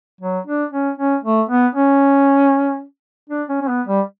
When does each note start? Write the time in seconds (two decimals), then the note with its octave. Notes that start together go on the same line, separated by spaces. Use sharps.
0.21 F#3
0.47 D4
0.73 C#4
0.98 C#4
1.24 A3
1.50 B3
1.75 C#4
3.30 D4
3.49 C#4
3.61 C#4
3.68 B3
3.88 G3